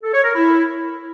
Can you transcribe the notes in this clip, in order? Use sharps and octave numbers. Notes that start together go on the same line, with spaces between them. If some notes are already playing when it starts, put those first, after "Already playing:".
A4
C#5
A#4
E4